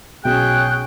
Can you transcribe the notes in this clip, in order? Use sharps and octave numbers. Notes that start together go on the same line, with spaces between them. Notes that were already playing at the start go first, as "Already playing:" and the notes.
B1 C#4 G#4 G5 F#6